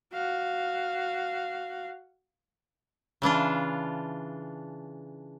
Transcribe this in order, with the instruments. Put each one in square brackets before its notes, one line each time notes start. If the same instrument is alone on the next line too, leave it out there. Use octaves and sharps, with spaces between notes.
[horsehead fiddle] F#4 F5
[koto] C#3 E3 D4 F4